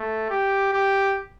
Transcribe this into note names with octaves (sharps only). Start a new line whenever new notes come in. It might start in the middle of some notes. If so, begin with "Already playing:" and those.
Already playing: A3
G4
G4